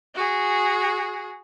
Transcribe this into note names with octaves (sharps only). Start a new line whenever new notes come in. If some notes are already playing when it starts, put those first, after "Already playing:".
F#4 G#4